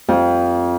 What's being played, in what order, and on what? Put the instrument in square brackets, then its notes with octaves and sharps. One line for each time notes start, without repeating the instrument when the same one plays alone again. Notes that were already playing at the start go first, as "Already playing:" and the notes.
[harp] F2